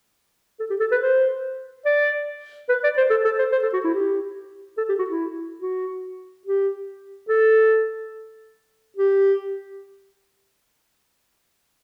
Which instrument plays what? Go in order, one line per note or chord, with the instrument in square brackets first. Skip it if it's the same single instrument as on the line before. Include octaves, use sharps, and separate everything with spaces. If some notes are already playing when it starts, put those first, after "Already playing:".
[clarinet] A4
G4
A4
B4
C5
D5
B4
D5
C5
A4
A4
C5
C5
A4
F#4
E4
G4
A4
G4
F#4
E4
F#4
G4
A4
G4